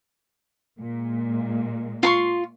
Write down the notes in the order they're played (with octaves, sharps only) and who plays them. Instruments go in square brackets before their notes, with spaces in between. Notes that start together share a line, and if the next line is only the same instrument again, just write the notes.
[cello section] A#2 G#3
[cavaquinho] F4 C6 C#6